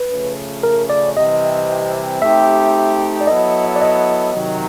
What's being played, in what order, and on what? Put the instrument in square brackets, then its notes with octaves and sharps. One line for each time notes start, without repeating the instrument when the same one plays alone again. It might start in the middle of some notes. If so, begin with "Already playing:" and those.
Already playing: [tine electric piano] B4
[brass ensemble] C#3 F3 A3 C#4
[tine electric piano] A#4
D5
[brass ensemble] C3 E3 G3 C4 [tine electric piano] D#5
[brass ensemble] A3 C4 D#4 G4 [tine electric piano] E5
[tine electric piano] D5
[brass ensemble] F#3 B3 E4 A4 [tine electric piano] D#5
[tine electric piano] D5
D#5
[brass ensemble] C3 D#3 F#3